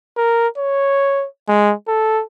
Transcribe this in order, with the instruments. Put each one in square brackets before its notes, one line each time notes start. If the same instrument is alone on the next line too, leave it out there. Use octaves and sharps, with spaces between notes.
[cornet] A#4
C#5
G#3
A4